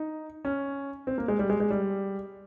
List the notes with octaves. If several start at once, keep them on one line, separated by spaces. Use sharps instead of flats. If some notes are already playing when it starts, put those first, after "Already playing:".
Already playing: D#4
C#4
C4
A#3
G#3
G3
G#3
G#3
G3